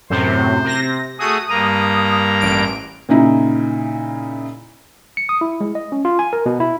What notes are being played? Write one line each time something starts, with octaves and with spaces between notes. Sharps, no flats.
F#2 A2 C3 C5
C3 A#6
A3 F#4 G#4 D#6
G2 A#3 A#5
A1 D7
A#2 C#3 D#4 E4
C#7
D#6
E4
G#3
D#5
C#4
F4
G#5
A#4
B2
E4